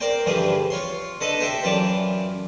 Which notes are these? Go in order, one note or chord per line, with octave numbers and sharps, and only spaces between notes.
A#4 C5 D5 G5
G2 D3 E3 F3 G4 G#4
F4 C#5 C6
D3 A4 B4 D#5 A5
G4 A4 C5 E5 G5
F#2 E3 F4 D5 G5 A5